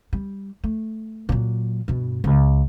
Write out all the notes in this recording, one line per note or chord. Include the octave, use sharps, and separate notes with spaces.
G3
A3
A#2 F#3
G2 B2
C#2